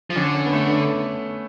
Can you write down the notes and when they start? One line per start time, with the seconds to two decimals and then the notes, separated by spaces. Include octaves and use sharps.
0.10 F3
0.16 D3 C#4
0.34 C#4
0.46 B3
0.53 A3